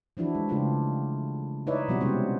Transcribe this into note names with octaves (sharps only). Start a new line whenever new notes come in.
E3 F3 D4 E4 F#4
G#3
C#3 A3 D4 F4 G4
D#4 E4 B4 C#5 D5 E5
B2 F3 G3 B3 C4 F#4
C3 G3 G#3 C#4 E4 C5